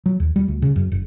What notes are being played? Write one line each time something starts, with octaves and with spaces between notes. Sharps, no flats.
F#3
D#2
G3
D2
C#3
F#2
F#1